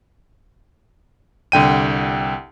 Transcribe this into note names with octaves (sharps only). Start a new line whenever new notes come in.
C2 D3 G5 D#7